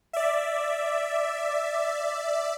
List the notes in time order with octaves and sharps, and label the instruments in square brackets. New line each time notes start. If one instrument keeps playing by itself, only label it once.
[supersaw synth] D5 E5